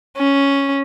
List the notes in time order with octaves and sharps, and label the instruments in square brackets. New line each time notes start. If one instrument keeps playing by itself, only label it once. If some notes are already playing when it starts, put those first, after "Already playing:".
[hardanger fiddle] C#4